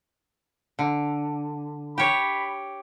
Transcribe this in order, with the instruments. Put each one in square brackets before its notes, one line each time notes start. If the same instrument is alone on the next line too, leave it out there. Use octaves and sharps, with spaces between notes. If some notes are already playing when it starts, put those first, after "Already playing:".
[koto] D3
[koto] G4 C#5 [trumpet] B5